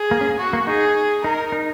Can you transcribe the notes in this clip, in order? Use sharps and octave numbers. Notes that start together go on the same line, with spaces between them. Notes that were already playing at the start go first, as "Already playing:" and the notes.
Already playing: G#4
A#3
C#4
A#3
F#4
A#3
D#4 G#4
D#4 A#4
D#4